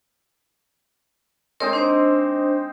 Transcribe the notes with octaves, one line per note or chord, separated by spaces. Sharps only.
G#3 C4 D#4 A#4 C#5
D4 C5